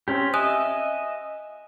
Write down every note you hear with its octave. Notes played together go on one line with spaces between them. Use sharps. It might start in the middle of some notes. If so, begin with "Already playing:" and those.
C4 C#4 G4
D#5 E5 G#5 D#6 F#6